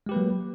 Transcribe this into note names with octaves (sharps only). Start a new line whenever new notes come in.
F#3 G#3 A#3 G4 B4